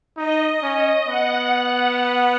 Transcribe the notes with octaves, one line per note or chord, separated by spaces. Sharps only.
D#4 D#5
C#4 D#5
B3 F#5